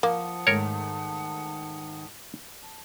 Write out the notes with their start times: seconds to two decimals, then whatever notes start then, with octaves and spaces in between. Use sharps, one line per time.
0.03 F3 A#3 F#5 A5 D#6
0.47 G#2 D#3 A3 A#4 C#5
2.61 A5